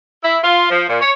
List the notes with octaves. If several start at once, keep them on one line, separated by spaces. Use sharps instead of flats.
E4
F4
F3
A#2
C#5